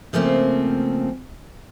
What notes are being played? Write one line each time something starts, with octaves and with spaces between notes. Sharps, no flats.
C#3 F3 A3 A#3 C4